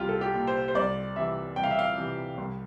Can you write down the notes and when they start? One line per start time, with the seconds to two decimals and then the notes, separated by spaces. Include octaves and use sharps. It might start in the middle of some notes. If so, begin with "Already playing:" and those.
Already playing: C2 F4 G4
0.09 A4
0.21 G4
0.35 A#2
0.47 C5
0.68 C5
0.75 C2 D5
1.16 C3 E3 E5
1.56 C2 G5
1.64 F5
1.71 E5
1.79 F5
1.97 C3 E3
2.38 C2